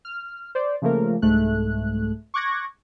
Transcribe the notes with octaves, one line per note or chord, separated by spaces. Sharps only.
F6
C5 D5
C#3 F3 A3 A#3 A#4
C2 G#2 A3 F#6
C#6 D6 F#6 G#6 A#6